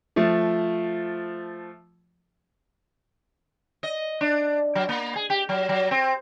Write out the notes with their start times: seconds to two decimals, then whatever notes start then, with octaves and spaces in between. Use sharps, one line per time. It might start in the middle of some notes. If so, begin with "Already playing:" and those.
0.16 F3 A3
3.83 D#5
4.21 D4
4.75 F#3
4.89 A#3
5.16 G#4
5.30 G4
5.49 F#3
5.69 F#3
5.91 C4